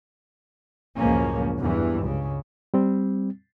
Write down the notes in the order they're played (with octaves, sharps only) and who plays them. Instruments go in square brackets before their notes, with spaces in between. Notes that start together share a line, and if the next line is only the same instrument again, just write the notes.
[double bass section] C#2 F#2 A2 F3 A#3 C#4
E2 G2 E3
C#2 C#3
[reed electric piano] G3 C4